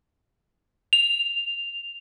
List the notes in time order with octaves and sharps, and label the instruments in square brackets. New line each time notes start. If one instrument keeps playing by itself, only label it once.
[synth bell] F7